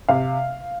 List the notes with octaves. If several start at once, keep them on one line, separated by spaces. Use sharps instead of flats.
C3 F5